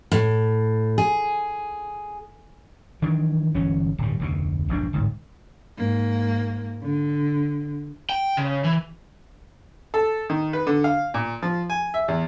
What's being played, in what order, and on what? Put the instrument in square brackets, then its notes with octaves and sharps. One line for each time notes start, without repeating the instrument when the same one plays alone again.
[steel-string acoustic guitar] A2
G#4
[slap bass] D#3 E3 F#3 D4
G1 E3 F#3 C#4
D1 G2
F1 D2 B2
E1 A#1 G2 D4
D1 G1 G#2
[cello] G#2 A#3
D3
[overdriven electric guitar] G5
C#3
E3
[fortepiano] A4
D#3
B4
D3
F5
A#2
F3
G#5
E5
E2